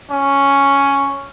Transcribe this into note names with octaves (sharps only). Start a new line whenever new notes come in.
C#4